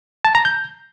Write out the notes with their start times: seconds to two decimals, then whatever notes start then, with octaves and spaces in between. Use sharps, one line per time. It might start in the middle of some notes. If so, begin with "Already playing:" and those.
0.25 A5
0.35 A#5
0.45 G6